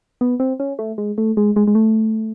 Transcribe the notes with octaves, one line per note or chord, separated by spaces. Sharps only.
B3
C4
C#4
A3
G#3
A3
G#3
G#3
G#3
A3